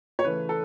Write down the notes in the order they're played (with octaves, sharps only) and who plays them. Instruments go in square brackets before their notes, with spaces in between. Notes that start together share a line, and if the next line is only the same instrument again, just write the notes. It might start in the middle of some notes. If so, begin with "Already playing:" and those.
[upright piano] C#5
C#3 E3 A3 B4
A4